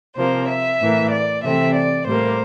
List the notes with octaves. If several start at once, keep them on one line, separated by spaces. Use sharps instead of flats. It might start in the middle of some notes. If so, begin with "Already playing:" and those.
C3 F3 A#3 C5
E5
A2 E3 A#3
D5
C3 E3 A3 C4 E5
D5
A2 G3 A#3 C5